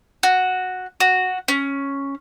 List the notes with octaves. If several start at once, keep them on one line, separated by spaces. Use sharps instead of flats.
F#4
F#4
C#4